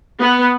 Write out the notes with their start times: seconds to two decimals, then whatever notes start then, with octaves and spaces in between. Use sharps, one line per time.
0.20 B3